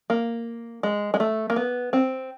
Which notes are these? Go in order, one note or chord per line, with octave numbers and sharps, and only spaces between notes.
A#3
G#3
G#3
A3
A#3
B3
C4